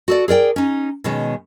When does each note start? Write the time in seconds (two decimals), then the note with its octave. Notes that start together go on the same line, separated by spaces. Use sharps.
0.08 F#4 A4 D5
0.28 G#4 A#4 D5 G5
0.56 C#4 D#4
1.04 B2 D#3 G#3 C#4